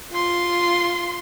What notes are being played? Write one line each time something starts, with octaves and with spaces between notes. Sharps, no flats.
F4 C6